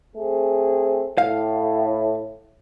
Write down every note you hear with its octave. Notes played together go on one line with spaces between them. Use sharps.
A3 C4 G#4
A2 F5